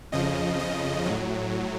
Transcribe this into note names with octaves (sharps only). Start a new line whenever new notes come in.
F2 C#3 F3 D#5
D#5
A2 F#3